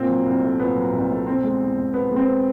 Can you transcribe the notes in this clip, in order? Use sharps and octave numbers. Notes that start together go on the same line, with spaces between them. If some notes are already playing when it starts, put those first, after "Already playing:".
Already playing: A#2 C4
F#3
C2
A3
A#2 B3
F#3
C2
A3
B2 C4
G#3
E2
E2
B2 B3
G#3
C4